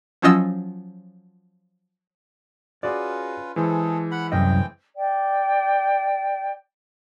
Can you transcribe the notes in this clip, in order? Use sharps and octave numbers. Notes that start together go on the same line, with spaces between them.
F3 F#3 C#4 F4 D#5 E6
C#4 F4 F#4 G#4 B4 D5
E3 G#3 G#4 A4 C5
F#5 B5
C2 F#2 C4 D#5 G5
D5 G5